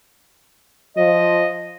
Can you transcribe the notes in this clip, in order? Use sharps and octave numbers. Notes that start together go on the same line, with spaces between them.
F3 D#5